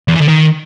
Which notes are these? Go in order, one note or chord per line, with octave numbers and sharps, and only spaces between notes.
E2
E3
D3
D#3